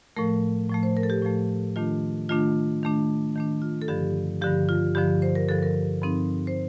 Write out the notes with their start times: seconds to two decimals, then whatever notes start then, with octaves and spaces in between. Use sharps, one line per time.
0.17 A2 F3 A3 A#4
0.70 A2 F3 A3
0.83 C5
0.97 A#4
1.03 A4
1.10 G4
1.22 A2 F3 A3
1.76 D#3 A3 D4 F4
2.29 D#3 A3 D4 F4
2.83 D#3 A3 D4
3.36 D#3 A3 D4
3.62 F4
3.82 A4
3.88 G2 D3 F3 G4
4.42 G2 D3 F3 G4
4.69 F4
4.95 G2 D3 F3 G4
5.22 C5
5.35 A#4
5.48 G2 D3 F3 A4
5.63 A#4
6.01 G2 F3 C4 D#4
6.47 C5